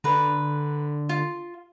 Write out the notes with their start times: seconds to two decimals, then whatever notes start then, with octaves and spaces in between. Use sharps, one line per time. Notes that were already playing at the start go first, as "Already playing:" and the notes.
0.04 D3 B4 A#5
1.09 F4